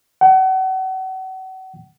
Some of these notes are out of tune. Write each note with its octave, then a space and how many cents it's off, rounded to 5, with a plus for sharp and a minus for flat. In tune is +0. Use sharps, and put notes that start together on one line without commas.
F#5 +35